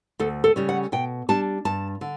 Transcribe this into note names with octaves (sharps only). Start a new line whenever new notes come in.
D2 A4
A4
C#3 G3 C#4
F#5
B2 G5
G3 D4 A5
G2 A5
D3